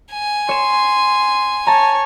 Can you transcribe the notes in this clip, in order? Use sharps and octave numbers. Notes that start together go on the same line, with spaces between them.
G#5
C#5 C6 E7
C#5 A5 A#5